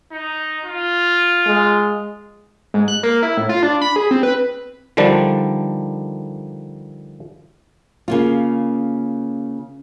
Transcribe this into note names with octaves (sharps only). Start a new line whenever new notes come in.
D#4
F4
G#3
G#2
F#6
A#3
E4
A2
F4
D4
B5
G#4
C4
B4
D3 D#3 F3 G3 D4
C#3 A#3 F4